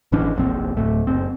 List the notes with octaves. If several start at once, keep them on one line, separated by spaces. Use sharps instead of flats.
G#1 E3 C#4 D4
F1 A#1 C4
D1 A3
F#1 C4